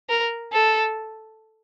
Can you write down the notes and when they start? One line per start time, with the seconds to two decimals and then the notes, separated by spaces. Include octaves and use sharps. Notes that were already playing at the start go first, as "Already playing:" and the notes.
0.09 A#4
0.53 A4